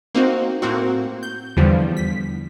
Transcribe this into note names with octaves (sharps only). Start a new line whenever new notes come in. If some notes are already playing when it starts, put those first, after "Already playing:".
A#3 C4 D#4 F#4
A2 A#3 C4 F#4
G6
E2 D3 F3 G3
B6